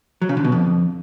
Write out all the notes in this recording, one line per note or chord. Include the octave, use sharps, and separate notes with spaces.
F#3
C#3
D3
B2
F2